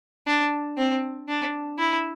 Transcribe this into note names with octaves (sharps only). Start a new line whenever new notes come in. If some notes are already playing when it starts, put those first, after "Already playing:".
D4
C4
D4
E4